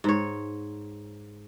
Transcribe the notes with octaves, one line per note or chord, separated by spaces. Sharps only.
G#2 C#5